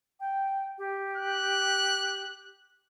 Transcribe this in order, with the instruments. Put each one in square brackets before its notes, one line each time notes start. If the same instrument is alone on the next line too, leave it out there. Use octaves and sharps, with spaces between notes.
[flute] G5
G4
[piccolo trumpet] F#6